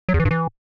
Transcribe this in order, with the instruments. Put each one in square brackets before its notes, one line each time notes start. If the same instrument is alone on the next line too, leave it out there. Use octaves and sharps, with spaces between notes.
[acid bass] F#3
E2
E3
G2
E3